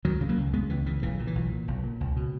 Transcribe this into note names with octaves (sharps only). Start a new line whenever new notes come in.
C#2 D#3 F#3
C#3
F#3 A#3
C#2
C#3 G#3 B3
C#2 E3
C#3 E3
B1 E3
A#2
E3
B1
A#2
B1
A#2
C#2
B2